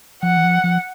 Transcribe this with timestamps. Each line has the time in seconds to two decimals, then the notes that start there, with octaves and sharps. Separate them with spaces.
0.23 F3 F#5
0.37 E3
0.44 F3
0.64 F3